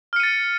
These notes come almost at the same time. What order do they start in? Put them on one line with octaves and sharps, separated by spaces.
F6 C#7 D#7 A6